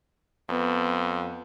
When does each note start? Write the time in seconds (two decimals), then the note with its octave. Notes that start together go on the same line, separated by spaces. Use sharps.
0.49 F2 B3